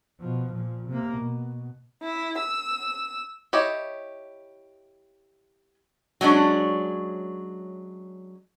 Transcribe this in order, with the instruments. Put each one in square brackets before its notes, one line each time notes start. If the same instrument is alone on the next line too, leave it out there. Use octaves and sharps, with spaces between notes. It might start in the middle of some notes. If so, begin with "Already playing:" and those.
[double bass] B2 F3
A#2 F3
C3 A#3
B2
[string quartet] E4
E6
[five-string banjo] E4 G4 C#5 D#5
[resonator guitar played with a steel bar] F#3 G#3 C#4 D4